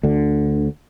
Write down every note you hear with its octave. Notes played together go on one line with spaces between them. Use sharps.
D2 D3